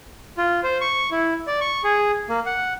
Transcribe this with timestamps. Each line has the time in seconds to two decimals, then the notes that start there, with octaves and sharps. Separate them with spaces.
0.37 F4
0.64 C5
0.81 C#6
1.11 E4
1.47 D5
1.61 C#6
1.84 G#4
2.29 A#3
2.46 F#5